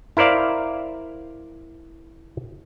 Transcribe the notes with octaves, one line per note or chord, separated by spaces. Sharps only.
E4 A#4 C5 D5 F5